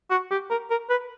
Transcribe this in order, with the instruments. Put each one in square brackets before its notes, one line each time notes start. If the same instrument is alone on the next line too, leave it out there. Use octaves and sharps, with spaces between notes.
[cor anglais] F#4
G4
A#4
A#4
B4